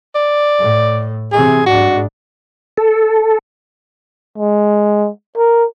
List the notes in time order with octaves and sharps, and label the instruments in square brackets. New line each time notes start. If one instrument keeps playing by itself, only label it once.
[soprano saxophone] D5
[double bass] A2
[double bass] C3 E3 [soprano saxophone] G#4
[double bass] G#2 D4 [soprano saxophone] F#4
[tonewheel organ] A4
[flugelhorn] G#3
A#4